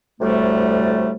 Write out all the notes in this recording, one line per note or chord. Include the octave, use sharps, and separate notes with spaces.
D2 A2 C3 G3 A3